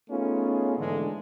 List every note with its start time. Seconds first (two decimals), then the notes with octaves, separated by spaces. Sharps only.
0.10 A3 B3 C#4 D#4 F4 G#4
0.78 G#2 D3 E3 G#3 A3